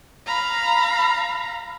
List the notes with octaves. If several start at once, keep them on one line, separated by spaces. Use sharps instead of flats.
F5 A#5 B5